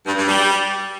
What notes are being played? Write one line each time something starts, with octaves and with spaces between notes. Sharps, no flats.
G2
G2
G3